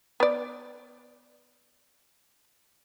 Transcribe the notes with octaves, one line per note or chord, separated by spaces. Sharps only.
B3 D5